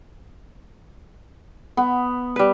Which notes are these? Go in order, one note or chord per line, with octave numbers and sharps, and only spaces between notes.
B3
G3 B4